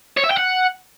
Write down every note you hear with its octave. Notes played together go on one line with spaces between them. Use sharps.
C#5
E5
G5
F#5